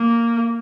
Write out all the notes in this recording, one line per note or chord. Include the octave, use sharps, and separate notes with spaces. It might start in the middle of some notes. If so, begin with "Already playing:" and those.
Already playing: A#3